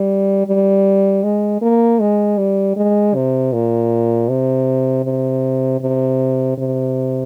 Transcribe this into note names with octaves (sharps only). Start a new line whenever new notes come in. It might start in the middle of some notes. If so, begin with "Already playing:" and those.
Already playing: G3
G3
G#3
A#3
G#3
G3
G#3
C3
A#2
C3
C3
C3
C3